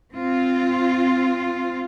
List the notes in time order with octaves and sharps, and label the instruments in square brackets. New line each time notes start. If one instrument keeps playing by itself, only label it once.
[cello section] C4 F4